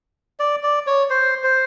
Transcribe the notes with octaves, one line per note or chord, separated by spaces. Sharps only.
D5
D5
C#5
C5
C5